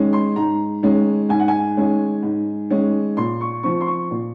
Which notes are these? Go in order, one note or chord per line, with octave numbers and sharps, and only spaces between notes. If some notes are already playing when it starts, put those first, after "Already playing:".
Already playing: D#3 G#3 C#4
C6
G#2 A#5
D#3 G#3 C#4
G#2 G#5
F#5
G#5
D#3 G#3 C#4
G#2
D#3 G#3 C#4
A#2 C6
C#6
F3 C4 C#6
C6
C#6
A#2